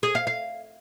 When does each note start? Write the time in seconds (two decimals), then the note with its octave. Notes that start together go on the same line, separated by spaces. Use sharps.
0.03 G#4
0.15 F5
0.27 F5